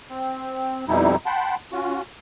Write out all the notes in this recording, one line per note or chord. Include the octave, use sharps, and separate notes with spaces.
C4
F2 B2 G3 D#4 E4
F#5 G5 A5 B5 C6
C#4 F4 F#4